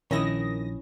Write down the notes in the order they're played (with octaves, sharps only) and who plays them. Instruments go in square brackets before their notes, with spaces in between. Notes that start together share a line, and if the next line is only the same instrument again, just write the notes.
[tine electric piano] A#1 [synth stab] D#3 D#6 A#6 [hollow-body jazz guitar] C#4 E4